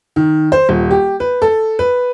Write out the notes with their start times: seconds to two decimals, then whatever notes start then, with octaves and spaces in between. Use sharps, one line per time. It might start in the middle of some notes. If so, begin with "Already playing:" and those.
0.16 D#3
0.52 C5
0.69 D#1
0.91 G4
1.20 B4
1.42 A4
1.79 B4